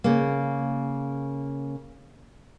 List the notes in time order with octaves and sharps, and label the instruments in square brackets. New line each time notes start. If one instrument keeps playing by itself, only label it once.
[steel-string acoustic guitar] C#3 A#3